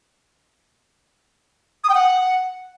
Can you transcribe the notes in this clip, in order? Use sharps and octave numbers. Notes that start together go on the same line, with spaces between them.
D#6
G5
F#5